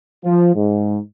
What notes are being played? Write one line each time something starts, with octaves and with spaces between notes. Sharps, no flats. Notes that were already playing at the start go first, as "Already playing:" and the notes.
F3
G#2